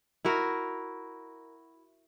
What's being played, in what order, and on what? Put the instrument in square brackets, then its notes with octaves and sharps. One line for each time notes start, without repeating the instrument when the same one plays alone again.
[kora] E4 F#4 A#4